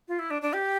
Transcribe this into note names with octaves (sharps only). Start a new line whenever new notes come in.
F4
E4
D4
D4
G4